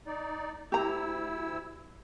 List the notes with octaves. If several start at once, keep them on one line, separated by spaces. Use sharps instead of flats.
D#4 D5
D2 E4 G4 A#5 E6